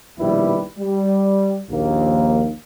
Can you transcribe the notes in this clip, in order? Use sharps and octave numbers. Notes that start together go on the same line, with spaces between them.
A#1 B2 D#3 G3 E4 B4
G3
A#1 D#2 A#3